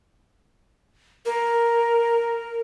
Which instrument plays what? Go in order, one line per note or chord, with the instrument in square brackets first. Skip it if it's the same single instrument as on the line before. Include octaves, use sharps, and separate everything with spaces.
[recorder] A#4